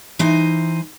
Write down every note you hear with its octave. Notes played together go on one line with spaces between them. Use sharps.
E3 D#4 C5 G#5